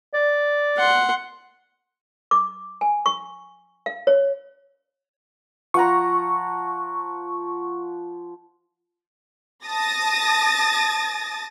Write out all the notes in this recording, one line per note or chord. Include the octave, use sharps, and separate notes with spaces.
D5
F#5 C6
D6
G#5
C#6
F5
C#5
F3 F#5 A#5 C#6
A5 D#6 A6 A#6